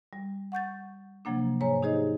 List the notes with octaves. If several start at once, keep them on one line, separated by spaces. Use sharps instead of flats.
G3
F#5 C#6 G6 A6
C3 F3 F#3 A#3 D4
G#2 C5 C#5 G#5 A#5
D#4 G4 G#4 C5 D#5